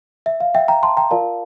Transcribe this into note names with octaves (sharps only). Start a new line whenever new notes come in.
E5
F5
E5 G5
G5 A#5
A5 C6
G5 A#5
F4 A#4 D5 F5 A5